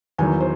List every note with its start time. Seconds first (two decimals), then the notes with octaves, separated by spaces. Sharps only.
0.18 E2 D#3 F#3 G#5
0.40 C5